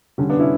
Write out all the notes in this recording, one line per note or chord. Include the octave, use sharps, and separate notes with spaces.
D3 G3 C#4
B3 D4
C#4 E4